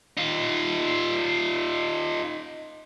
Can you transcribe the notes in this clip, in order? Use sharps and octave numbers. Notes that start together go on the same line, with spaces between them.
D#4 F4